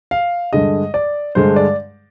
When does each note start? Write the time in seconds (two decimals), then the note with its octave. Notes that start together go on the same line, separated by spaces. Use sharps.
0.11 F5
0.53 G2 D3 G#3 D#5
0.94 D5
1.35 G2 D3 G#3 C5
1.56 D5